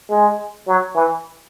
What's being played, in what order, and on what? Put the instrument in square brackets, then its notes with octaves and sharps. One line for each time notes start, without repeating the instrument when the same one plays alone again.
[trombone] G#3
F#3
E3